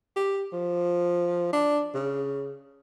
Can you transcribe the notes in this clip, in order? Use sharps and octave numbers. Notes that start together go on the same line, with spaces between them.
G4
F3
D4
C#3